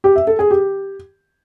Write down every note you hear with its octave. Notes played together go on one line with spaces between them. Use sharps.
G4
E5
A4
G#4
G4